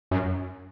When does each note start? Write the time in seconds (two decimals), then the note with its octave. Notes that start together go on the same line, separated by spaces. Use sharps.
0.11 F#2